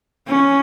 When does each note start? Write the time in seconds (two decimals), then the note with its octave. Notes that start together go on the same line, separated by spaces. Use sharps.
0.28 C#4